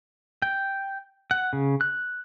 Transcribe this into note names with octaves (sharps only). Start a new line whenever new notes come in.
G5
F#5
C#3
F#6